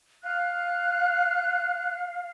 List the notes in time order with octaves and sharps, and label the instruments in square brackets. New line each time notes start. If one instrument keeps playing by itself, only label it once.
[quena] F5 [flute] F#6